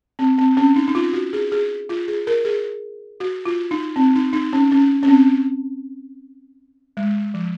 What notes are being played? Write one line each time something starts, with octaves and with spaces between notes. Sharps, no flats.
C4
C4
C#4
D#4
D#4
F4
F#4
G#4
G#4
F4
G#4
A#4
G#4
F#4
F4
D#4
C4
D#4
D#4
C#4
C#4
C#4
C4
G#3
F3